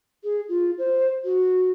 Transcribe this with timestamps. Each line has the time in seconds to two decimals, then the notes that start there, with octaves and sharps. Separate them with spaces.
0.24 G#4
0.49 F4
0.79 C5
1.25 F#4